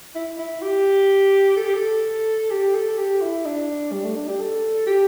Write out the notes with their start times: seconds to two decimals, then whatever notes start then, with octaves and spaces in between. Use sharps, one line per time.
0.15 E4
0.38 E4
0.62 G4
1.56 A4
1.65 G4
1.74 A4
2.51 G4
2.75 A4
2.98 G4
3.22 E4
3.45 D4
3.92 G3
4.04 A3
4.16 D4
4.28 G4
4.39 A4
4.87 G4